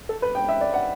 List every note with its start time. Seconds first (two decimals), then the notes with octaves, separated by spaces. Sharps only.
0.09 A4
0.22 B4
0.35 G5
0.49 E5
0.61 D5
0.74 F#5